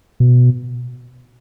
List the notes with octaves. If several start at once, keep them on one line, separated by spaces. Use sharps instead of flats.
B2